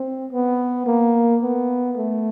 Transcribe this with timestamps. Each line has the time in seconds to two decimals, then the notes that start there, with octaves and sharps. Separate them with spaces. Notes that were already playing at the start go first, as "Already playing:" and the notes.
Already playing: C4
0.33 B3
0.86 A#3
1.42 B3
1.97 A3